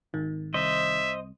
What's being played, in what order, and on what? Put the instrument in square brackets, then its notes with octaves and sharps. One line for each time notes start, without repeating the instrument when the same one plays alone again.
[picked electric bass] G#1 [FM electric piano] D#3
[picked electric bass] C2 [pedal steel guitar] C5 D#5 [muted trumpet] E5